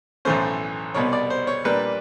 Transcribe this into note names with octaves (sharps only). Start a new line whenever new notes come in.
B1 A2 E3 A3 C#4 C5
C2 B2 G3 B3 C#5
D5
C5
C#5
A#2 G3 A#3 D4 B4